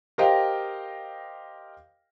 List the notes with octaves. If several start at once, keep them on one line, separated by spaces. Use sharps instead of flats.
G4 A#4 C5 D#5 F5 G5